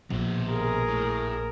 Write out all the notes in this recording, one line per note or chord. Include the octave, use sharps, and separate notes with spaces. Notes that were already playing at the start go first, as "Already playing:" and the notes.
A#1 B2 C5
G#4 A#4
A2